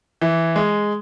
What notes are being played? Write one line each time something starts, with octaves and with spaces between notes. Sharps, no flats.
E3
G#3